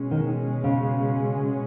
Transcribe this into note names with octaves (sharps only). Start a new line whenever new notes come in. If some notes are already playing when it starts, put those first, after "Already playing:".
Already playing: B2 G#3 C#4
D#3
C#3